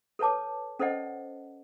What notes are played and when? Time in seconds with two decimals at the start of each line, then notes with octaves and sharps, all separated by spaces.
0.19 A4 B4 C#5 A5 D6
0.79 C#4 A4 C5 D5 D#5 F#5